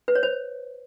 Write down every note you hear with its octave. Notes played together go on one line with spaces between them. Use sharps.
B4
C#5
C5